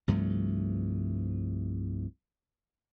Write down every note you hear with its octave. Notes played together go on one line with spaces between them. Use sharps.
C2 G2 F3 A3